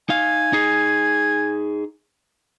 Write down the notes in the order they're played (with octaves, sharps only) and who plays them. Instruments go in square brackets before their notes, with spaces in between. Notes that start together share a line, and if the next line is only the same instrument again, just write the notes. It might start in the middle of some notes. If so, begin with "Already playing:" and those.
[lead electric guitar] D#4 F5 [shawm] G#5
[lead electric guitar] D#4 G#4